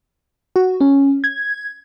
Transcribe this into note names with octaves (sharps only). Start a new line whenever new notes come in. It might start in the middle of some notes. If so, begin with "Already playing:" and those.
F#4
C#4
G#6